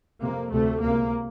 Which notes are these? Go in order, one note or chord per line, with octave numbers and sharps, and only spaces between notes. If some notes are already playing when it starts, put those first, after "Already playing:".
F2 C3 A#3
D2 C3 A3
C#2 C3 A#3